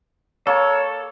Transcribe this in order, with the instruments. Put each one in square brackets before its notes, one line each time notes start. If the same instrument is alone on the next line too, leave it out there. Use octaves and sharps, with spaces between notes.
[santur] A#3 [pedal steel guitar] A4 [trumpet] C#5